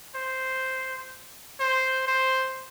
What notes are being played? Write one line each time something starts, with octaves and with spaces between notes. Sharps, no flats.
C5
C5
C5